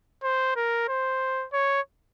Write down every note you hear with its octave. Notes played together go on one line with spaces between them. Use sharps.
C5
A#4
C5
C#5